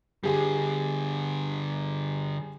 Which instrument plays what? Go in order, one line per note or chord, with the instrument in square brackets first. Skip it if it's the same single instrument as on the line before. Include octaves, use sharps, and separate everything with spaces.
[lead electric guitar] D3 G3 [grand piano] G4 G#4